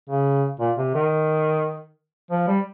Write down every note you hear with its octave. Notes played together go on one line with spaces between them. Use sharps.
C#3
A#2
C3
D#3
F3
G3